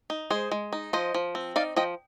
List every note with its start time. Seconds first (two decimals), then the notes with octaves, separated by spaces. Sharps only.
0.10 D#4
0.30 G#3 G#4 C5
0.51 G#3
0.73 D#4
0.93 F3 C5 D#5
1.15 F3
1.35 C4
1.56 D#4 D5 F5
1.76 F3 D#5 G5